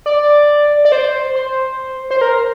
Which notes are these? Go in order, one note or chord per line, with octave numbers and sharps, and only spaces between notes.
D5
D5
C5
C5
C5
A#4